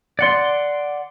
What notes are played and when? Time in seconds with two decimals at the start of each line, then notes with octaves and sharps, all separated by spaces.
0.19 D5 F#5 C6